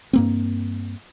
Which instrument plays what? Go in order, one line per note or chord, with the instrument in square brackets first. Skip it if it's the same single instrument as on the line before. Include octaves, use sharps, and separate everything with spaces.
[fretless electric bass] G2 A#3 C4